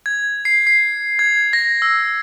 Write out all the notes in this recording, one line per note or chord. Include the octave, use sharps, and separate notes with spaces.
G#6
C7
C7
G#6
A#6
E6